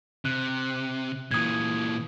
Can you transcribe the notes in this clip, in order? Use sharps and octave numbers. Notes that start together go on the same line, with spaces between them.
C3 F#6
A#2 E3 D#6 G#6